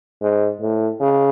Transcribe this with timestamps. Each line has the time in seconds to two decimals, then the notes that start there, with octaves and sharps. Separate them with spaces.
0.22 G#2
0.61 A2
1.01 C#3